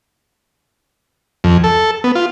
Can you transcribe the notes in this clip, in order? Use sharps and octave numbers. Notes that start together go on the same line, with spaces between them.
F2
A4
B3
F4